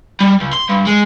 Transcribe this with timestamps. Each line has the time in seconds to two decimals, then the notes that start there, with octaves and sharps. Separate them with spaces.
0.20 G3
0.40 C#2
0.53 C6
0.69 G2
0.87 G#3